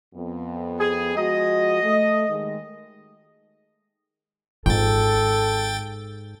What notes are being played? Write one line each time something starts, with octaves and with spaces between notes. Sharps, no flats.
F2 B3
G#4
F3 G#3 F#4 D#5
A3
D#2 G#3
G#1 G#2 F4 A4 G5 A6